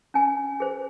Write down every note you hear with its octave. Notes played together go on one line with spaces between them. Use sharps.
C#4 G#5
G#4 C5